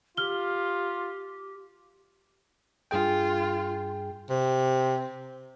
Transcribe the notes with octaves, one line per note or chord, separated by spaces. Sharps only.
F4 G4 F6 G7
G2 F4 G#4 G5
C3